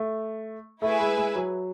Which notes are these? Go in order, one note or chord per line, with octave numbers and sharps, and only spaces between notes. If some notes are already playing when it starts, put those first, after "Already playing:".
Already playing: A3
A3 E4 G#4 B4 E5 G#5
G#3
G#3
F#3